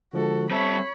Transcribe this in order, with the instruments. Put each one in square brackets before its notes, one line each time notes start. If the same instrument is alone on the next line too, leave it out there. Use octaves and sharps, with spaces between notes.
[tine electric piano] D3 F3 G#3 [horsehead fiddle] F#4 A4
[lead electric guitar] G3 A4 [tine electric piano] C4 E5 [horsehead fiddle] C#5 B5